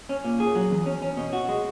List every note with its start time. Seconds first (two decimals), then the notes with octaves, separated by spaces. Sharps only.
0.09 C#4
0.24 A#2
0.40 G#4
0.55 F#3
0.71 E2
0.86 C#4
1.02 C#4
1.17 B2
1.33 F#4
1.49 G#3